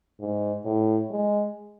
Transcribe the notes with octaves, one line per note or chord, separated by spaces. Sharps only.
G#2
A2
G#3